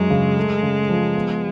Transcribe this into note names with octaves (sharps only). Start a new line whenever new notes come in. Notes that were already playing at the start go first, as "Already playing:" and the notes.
Already playing: F#2 F#3 G#3 D4
C#3
A3
C#3
F3
B3